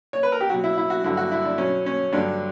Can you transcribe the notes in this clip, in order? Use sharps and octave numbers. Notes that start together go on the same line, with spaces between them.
C#5
B4
A#4
G4
B2 F#3 F#4
E4
E4
F#4
G2 D3 F#3 E4
F#4
E4
D4
B2 F#3 C#4
C#4
G2 D3 F#3 D4